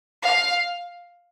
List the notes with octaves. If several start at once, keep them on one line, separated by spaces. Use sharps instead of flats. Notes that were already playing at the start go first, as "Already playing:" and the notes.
F5